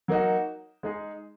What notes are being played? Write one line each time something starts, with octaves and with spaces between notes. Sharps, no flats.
F#3 A#3 D#4 F#4
G#3 D#4 G#4